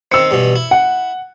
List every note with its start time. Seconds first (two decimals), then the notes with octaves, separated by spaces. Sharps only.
0.12 D#3 C4 E6 C#7
0.31 G2 B2 E3
0.55 E4
0.71 F#5